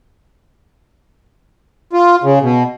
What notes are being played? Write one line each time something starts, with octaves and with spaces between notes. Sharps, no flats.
F4
C#3
B2